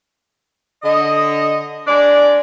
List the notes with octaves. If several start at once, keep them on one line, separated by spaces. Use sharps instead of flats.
D3 D#5
G#3 D4 D5